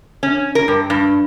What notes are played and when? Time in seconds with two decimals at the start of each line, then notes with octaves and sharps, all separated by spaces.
0.23 C#4
0.55 A#4
0.68 G2
0.90 G2